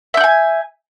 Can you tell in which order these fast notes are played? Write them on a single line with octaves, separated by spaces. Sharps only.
E5 G6 F#5 G#5